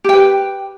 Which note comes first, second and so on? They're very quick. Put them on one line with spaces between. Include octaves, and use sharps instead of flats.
G4 G5 B4